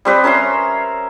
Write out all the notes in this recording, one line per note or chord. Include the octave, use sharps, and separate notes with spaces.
G3 C4 B4 D#5
C#4 A#4 E5 C6